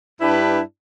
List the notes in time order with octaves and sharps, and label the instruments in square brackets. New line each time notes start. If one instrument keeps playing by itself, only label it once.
[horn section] G2 D4 E4 G4 B4